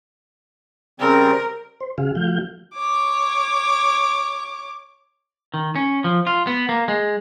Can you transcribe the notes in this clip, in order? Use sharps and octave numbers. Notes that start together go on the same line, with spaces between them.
C#3 G3 C4 A#4
C5
C#3 F#4 G#4 F5
F3 A3 F#4 F5 G6
C#5 D6
D#3
C#4
F3
F4
B3
A#3
G#3